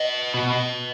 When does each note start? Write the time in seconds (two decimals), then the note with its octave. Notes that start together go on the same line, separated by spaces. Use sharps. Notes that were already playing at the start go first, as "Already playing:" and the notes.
Already playing: B4 D#5
0.34 B2